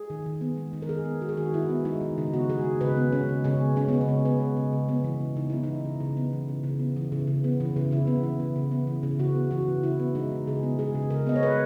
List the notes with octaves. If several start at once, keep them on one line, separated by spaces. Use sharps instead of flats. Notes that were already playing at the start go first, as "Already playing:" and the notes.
Already playing: G#4
D#3
D#3
B3
G#3
D#3
A#4
D#3 G#4
B3
G#3 F#4
G#4
D#3 F#4
D#3 E4
B3
G#3 D#4
D#3
C#3 D#4
B3 F#4
G#3 G#4
C#3
C#3 B4
B3
G#3 C#4
C#3
C#3 C#4
B3
G#3 C#4
C#3 B3
C#4
C#3
B3
G#3
C#3
C#3
B3
E3
C#3
C#3 D#4
B3 E4
E3 D#4
C#3
C#3
B3
E3
C#3
C#3
B3
E3
C#3
C#3
B3
E3
C#3
C#3 E4
B3
E3
C#3
C#3
B3
E3
C#3
C#3 F#4
B3
E3 F#4
C#3
C#3 E4
B3
G#3 D#4
C#3
C#3 G#4
B3
G#3 G#4
C#3
C#3 A#4
B3 D#5
C#5
G#3 B4